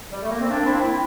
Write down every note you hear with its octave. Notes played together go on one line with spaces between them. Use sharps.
G3
A3
A#3
C4
A#3 D4
C4 E4
C4 E4